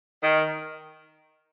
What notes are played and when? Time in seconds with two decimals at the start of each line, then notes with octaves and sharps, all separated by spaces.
0.22 D#3